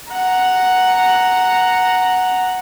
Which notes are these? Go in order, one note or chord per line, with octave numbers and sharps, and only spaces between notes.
F#5 A#5